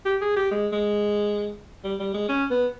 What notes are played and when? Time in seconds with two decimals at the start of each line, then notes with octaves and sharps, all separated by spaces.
0.06 G4
0.22 G#4
0.36 G4
0.51 G#3
0.73 G#3
1.84 G3
2.00 G3
2.14 G#3
2.29 C#4
2.51 B3